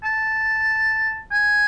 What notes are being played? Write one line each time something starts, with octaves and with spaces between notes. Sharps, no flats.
A5
G#5